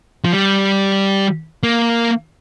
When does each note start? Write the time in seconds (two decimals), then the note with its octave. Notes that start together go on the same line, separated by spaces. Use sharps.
0.25 F3
0.32 G3
1.63 A#3